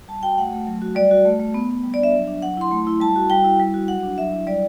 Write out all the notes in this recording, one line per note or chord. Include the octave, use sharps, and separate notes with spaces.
G3 A5
F#4 G5
A3 F#5
A3
F#3
F#4
G3 D5
F#4
A3
A3
B3
B3
G3
D5
D4 E5
F#3
D4
F#3 F#5
E4 C6
A3
E4
G3 A5
F#4
G3 G5
E4
G3
F#4
F#3 F#5
D4
F#3 E5
E4
G3 D5